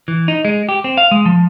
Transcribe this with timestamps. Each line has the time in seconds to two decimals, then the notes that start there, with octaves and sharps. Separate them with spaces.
0.08 E3
0.28 D#4
0.45 G#3
0.69 G4
0.84 C4
0.97 F5
1.11 G#3
1.26 F3